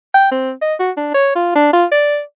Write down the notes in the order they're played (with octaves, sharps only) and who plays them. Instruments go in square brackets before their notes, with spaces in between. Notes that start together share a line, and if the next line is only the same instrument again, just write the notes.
[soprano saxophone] G5
C4
D#5
F#4
D4
C#5
F4
D4
F4
D5